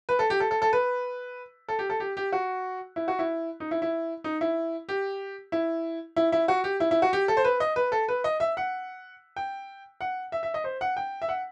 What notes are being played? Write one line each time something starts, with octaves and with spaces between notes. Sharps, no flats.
B4
A4
G4
A4
A4
A4
B4
A4
G4
A4
G4
G4
F#4
E4
F#4
E4
D#4
E4
E4
D#4
E4
G4
E4
E4
E4
F#4
G4
E4
E4
F#4
G4
A4
C5
B4
D#5
B4
A4
B4
D#5
E5
F#5
G5
F#5
E5
E5
D#5
C5
F#5
G5
E5
F#5